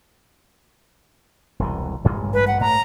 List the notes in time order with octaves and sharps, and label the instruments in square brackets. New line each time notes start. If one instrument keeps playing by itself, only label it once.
[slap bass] E1 C2 E3
A1 G2 G#3
[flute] B4
F#5
[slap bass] A2 [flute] A#5